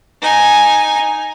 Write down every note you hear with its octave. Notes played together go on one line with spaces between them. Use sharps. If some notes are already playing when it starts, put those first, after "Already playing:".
D#4 G#5